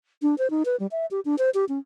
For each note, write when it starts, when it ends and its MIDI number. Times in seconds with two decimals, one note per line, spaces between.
0.22 0.35 62
0.38 0.50 72
0.50 0.63 63
0.65 0.76 71
0.80 0.87 55
0.91 1.06 76
1.11 1.20 67
1.25 1.36 62
1.38 1.50 72
1.54 1.65 67
1.69 1.79 61